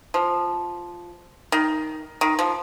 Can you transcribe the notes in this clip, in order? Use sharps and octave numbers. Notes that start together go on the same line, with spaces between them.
F3
D#3
D#3
F3